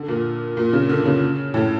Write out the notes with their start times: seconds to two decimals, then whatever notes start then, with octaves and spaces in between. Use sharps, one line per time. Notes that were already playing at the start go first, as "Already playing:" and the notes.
Already playing: D3
0.08 A#2
0.57 A#2
0.73 C#3
0.89 D3
1.06 C#3
1.54 A2